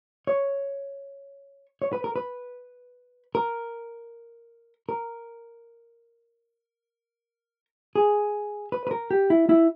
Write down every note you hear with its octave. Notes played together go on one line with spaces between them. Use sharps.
C#5
C#5
B4
A#4
B4
A#4
A#4
G#4
B4
B4
A#4
G4
E4
E4